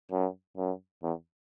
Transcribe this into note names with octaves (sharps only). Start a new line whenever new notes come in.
F#2
F#2
E2